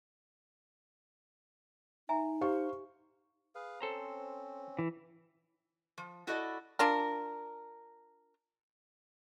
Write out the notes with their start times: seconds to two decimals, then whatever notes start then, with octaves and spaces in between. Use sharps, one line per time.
2.09 D#4 E5 G#5 A#5
2.41 G4 C5 F5 C#6
3.55 G#4 B4 F5
3.81 C4 C#4 A4 C5 A#5
4.79 E3
5.98 F3
6.27 E4 F#4 A4 D5 D#5
6.79 D4 F4 A#4